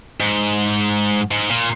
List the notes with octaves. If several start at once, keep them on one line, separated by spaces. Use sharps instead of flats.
G#2
G#2
A#2